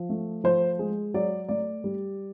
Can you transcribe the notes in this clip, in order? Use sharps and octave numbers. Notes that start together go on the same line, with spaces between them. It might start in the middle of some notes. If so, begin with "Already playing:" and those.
Already playing: F3
A3
F3 C5
G#3
F#3 D5
A3 D5
G3